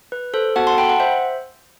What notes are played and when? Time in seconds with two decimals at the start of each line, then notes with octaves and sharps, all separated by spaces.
0.12 B4
0.34 A4 C5
0.56 B3 F#4 A4 F#5 A5
0.67 A5 C6
0.78 G5 B5
0.89 F#5
1.00 C5 E5